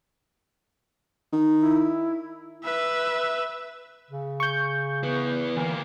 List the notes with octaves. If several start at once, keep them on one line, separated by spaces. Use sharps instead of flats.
D#3
E4
B4 E5
C#3
C#6 G6
E3 B3
D2 E3 A#3